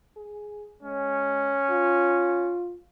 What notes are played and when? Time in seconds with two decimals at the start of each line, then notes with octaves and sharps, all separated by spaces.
0.16 G#4
0.82 G#3 C#4
1.70 F4